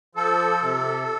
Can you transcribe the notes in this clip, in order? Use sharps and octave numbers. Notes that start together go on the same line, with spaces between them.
F3 A4
C3